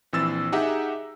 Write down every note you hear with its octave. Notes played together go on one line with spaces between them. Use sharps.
A#1 E3 C4 E6 A6 E7
D#4 G4 G#4 E5 F#5 A#5